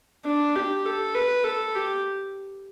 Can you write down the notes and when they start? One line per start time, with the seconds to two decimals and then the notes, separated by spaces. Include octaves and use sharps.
0.25 D4
0.55 G4
0.85 A4
1.14 B4
1.44 A4
1.75 G4